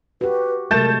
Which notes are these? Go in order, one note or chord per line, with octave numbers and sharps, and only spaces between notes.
F#4 G4 B4
C3 F#3 G#3 A3 A#4 G6 A6 E7